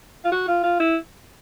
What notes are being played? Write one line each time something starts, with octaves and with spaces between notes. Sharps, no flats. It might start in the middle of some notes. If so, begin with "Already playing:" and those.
F4
F#4
F4
F4
E4